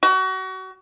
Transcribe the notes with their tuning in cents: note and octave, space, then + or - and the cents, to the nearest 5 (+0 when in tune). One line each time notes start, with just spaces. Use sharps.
F#4 +30